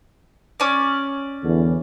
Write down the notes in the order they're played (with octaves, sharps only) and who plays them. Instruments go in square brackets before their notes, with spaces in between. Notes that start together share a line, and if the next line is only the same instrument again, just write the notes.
[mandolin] C#4 D5
[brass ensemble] E2 D3 E3